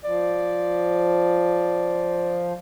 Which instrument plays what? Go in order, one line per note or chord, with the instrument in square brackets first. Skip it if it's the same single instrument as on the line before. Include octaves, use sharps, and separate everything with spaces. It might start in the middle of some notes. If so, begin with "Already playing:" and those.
[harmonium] F3 [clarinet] D5